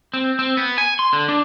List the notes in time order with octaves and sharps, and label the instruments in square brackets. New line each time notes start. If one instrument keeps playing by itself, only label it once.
[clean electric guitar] C4
C4
B3
G#5
C6
D3
D4